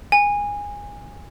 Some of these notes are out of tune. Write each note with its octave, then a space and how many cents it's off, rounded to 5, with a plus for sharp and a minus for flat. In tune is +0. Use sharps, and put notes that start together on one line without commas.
G#5 -20